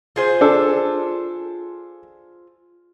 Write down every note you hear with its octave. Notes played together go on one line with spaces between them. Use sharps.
F4 G#4 C5
D4 A4